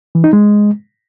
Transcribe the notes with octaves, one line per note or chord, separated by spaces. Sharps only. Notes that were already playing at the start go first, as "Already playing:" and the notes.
E3
D#4
G#3